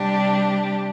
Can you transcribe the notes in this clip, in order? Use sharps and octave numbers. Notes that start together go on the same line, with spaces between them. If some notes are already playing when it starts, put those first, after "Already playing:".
Already playing: C3 G3 D4 G4